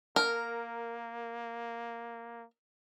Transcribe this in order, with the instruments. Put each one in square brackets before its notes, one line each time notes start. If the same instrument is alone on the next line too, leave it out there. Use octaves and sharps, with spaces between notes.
[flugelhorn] A#3 [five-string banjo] A#4